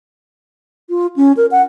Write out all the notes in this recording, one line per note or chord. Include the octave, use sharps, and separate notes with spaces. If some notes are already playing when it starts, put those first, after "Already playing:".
F4
C#4
A#4
F#5